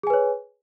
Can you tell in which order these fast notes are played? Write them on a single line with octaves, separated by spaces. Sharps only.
G#4 G#5 B4 C#5